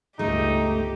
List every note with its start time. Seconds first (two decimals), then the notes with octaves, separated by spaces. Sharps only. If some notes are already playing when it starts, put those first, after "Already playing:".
0.19 G1 C#2 A3 D#4 G4 A4